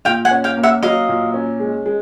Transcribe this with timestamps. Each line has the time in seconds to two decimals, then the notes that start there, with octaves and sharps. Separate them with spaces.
0.05 A#2 F5 G5
0.25 F#5 G#5
0.31 C#4
0.44 F5 G5
0.57 A#3
0.63 E5 F#5
0.83 F#3 D#5 F5
1.09 A#2
1.34 C#4
1.60 G#3
1.86 G#3